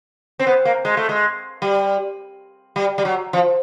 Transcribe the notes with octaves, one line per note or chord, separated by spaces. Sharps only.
C4
B3
A#3
G#3
A3
G#3
G3
G3
G3
F#3
F3